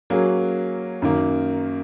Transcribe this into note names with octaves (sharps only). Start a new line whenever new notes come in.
F#3 A#3 C#4 G#4
F#2 D#3 A#3